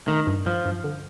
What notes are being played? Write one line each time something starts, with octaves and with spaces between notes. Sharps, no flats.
D#3 A3
G2
G2 F3
G2
D3